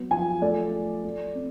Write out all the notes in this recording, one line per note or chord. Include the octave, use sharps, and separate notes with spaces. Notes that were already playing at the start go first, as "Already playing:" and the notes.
Already playing: F#3 B3
F3 G#5
A3 D5
A3
A3
C4